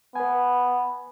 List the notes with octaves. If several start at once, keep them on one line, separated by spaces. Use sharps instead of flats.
B3 B4 G#5